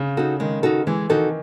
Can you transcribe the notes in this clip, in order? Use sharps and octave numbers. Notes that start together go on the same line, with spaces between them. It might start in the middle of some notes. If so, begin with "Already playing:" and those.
Already playing: C#3
D#4 F#4 A4
D#3 G#3
D#4 F#4 A4
E3 G#3
D#3 D#4 F#4 A4